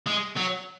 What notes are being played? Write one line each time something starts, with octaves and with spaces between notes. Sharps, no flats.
G#3
F#3